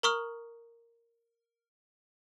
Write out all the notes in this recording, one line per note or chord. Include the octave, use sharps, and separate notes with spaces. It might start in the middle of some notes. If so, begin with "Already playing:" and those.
A#4 A#5 C#6 D#6 F6